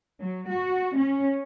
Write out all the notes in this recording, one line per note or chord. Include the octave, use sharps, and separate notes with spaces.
F#3
F#4
C#4